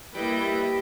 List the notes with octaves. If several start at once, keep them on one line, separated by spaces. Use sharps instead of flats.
G3 A#3 E4 B4 D#5 G5